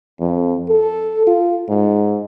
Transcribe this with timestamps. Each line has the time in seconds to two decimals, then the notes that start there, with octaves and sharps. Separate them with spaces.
0.20 F2
0.69 A4
1.27 F4
1.69 G#2